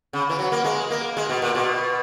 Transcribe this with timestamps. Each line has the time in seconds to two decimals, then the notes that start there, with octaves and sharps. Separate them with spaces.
0.13 C#3
0.30 E3
0.39 F#3
0.52 A#3
0.64 G#3
0.91 A#3
1.17 G#3
1.29 B2
1.42 A#2
1.55 B2